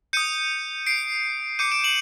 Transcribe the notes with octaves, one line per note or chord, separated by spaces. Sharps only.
D#6 G6 C#7 D#7
C7 D7
D6 G6 C#7 D#7
D7 E7
E7 F#7